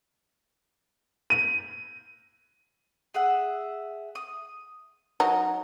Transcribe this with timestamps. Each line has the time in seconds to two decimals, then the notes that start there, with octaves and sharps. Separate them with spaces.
1.30 D#7
3.14 G#4 E5 F#5
4.15 D#6
5.20 F#3 D#4